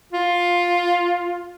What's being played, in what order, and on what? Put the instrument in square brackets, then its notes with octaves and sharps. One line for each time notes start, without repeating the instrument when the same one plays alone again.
[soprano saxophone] F4